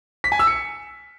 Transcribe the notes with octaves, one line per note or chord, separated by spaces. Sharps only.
B6
G#5
E6
C#7